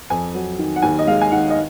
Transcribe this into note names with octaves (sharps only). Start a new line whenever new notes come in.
F2 G#5
F#3
D#3
F#5
D#2 G#5
D#5
G#3 F5
G#5
D#3 F#5
D#5